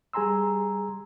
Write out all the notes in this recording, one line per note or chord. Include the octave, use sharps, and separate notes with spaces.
G3 G#4 G#5 A#5 C6 E6